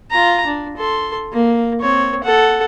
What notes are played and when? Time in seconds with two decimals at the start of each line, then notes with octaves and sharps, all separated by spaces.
0.11 F4 A#5
0.47 D4
0.77 A4 C6
1.33 A#3
1.81 C4 C#5
2.23 A4 F#5